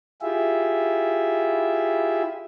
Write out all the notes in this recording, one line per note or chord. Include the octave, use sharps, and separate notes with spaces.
E4 F4 G4 G#4 E5